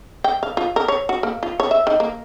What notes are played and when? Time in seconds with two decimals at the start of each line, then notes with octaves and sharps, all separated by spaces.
0.24 G5
0.43 F5
0.57 F4
0.76 A#4
0.88 C#5
1.09 F#4
1.23 A#3
1.43 F4
1.60 C#5
1.71 E5
1.87 D#3
2.00 A#3